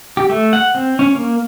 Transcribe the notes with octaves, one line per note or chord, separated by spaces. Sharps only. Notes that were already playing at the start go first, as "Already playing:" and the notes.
G4
A3
F#5
C4
C#4
A#3